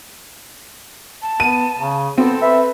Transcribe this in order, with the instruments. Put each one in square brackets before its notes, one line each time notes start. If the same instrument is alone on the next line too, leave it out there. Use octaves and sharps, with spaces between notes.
[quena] A5
[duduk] B3 [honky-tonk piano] D#7
[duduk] C#3
[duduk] B3 [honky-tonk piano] C4 [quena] A4
[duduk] B4 [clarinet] E5